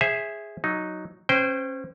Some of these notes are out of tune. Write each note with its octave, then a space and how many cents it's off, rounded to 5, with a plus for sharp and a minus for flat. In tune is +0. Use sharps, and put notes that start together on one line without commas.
G#4 -5 C5 +30 E5 -5
F#3 +0 D#4 +0
C#4 -30 C5 -20 G5 +0